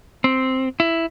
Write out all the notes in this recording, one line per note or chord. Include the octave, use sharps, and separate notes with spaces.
C4
E4